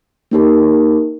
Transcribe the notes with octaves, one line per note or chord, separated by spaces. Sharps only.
A#3 D#4 G4 A#4